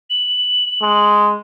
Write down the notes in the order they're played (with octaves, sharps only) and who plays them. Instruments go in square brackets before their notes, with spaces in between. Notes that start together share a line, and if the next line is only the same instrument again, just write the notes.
[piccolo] F#7
[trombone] G#3